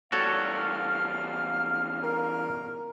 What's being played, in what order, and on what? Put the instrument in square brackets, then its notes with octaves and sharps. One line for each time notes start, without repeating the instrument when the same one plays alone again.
[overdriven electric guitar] E2 G3 [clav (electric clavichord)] F#4 A4 C#5 [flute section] F5 F6
[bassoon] A#4